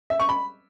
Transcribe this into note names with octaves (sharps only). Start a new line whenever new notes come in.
E5
C#6
B5